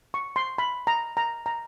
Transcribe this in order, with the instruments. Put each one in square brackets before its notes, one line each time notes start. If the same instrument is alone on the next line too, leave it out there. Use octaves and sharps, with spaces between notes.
[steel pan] C#6
C6
B5
A#5
A#5
A#5